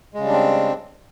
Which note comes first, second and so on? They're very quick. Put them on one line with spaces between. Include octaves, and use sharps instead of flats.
G#3 C#3 G3 D4 C4